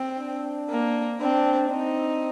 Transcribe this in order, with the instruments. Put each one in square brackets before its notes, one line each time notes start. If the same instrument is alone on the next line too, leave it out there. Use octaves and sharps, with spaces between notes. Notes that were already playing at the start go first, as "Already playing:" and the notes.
Already playing: [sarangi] C4
[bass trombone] D4
[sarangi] A#3
[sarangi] C4 [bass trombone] D4
[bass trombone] C4 [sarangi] D#4